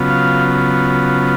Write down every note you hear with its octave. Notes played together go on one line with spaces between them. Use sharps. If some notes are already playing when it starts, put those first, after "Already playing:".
Already playing: C#3 F#3 B3 F4
F5